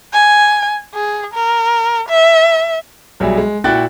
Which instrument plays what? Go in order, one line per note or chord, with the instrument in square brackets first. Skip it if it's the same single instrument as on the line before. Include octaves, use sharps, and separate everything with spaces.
[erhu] G#5
G#4
A#4
E5
[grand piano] B1 F#3 G3 G#4 E5
G#3
A#2 E4 F#4 G5 F#6 A6